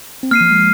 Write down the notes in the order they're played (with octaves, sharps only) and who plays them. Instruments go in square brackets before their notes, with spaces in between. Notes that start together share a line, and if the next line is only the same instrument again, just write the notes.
[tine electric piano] C4
[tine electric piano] A#3 [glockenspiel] F6 C7 D#7
[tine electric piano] F3
G#3